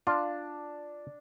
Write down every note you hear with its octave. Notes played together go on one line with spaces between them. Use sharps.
D4 F4